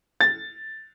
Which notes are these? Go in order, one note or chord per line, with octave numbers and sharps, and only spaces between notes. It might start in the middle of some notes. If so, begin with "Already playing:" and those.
A6